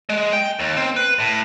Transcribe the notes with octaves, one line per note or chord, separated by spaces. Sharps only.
G#3
G5
D#2
C4
B4
A2